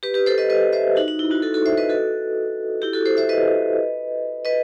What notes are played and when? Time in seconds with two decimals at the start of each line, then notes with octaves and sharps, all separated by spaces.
0.03 G4 B4
0.14 G4 B4
0.26 A4 C5
0.38 B4 D#5
0.50 B4 D#5
0.73 C5 E5
0.96 D#4 F#4
1.08 D#4
1.19 E4
1.31 D#4 F#4
1.42 F#4 A4
1.54 F#4 A4
1.66 C5 E5
1.78 B4 D#5
1.89 F#4 A4
2.82 E4 G4
2.93 F#4 A4
3.06 A4 C5
3.17 C5 E5
3.29 B4 D#5
4.45 B4 D#5